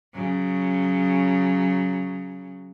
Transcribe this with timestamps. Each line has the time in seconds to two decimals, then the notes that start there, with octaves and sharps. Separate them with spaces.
0.14 C#3 F#3